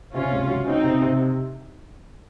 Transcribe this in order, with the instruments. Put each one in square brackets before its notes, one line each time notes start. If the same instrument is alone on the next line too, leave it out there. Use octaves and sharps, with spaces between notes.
[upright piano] C3 [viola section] C#4 F4
[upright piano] C#2
F#3
[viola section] C4 D#4 [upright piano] C#4
[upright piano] C3
C3